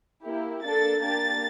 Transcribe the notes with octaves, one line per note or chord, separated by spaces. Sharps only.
A#3 E4 G4
A#3 D4 A4 A6
A#3 D4 G4 A6